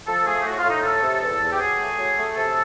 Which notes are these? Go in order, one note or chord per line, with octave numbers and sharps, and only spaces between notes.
F3 A4
A3 G#4
G4
A2 F#4
F4
A2
D#4
A3 A4
C3
E2
E2
G4
F#3 G#4
A3
F#3
A3
C3 A4